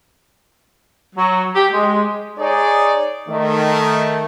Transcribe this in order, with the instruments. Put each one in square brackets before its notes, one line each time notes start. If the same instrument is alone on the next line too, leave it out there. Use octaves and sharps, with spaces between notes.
[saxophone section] F#3
G4
G#3
[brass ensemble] D#4 G#4 C#5 D5
D#3 A3